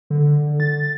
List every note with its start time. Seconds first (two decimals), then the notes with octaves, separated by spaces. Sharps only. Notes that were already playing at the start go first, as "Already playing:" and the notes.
0.10 D3
0.60 A6